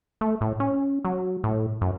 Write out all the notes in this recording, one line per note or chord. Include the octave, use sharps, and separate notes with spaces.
A3
A2
C#4
F#3
A2
F#2